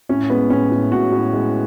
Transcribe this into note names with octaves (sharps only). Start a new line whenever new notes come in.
A2 C#4
G#3 B3
A2 C#4
A2
A2 F#4
A2
G#3